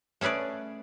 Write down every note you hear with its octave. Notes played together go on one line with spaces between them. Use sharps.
A3 C#4 G#4 B4 D5